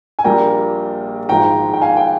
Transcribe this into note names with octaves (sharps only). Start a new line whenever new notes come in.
G#5
A#1 A#2 G3 A#3 G5 A#5
G#1 G#2 F3 G#3 G5 A#5
G5
F5 G#5
G5